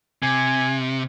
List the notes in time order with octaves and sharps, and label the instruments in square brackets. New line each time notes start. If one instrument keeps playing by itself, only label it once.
[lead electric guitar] C3 [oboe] G#5